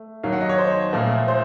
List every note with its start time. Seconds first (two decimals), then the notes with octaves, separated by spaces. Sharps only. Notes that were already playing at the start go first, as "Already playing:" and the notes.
Already playing: A3
0.23 D#2 D#3 F#3 F5
0.33 F#5
0.41 D#5
0.49 C#5
0.58 C5
0.93 A#2 F3 A3
1.28 C5